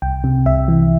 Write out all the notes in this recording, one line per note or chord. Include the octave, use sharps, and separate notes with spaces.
C2 G5
C3
C2 E5
E3